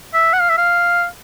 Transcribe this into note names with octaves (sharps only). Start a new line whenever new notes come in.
E5
F#5
F5
E5
F5